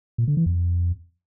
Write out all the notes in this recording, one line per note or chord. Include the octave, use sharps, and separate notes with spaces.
A#2
D3
E3
F2